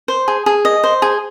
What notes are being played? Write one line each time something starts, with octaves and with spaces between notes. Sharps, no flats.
C5
G#4
G#4
D#5
C5
G#4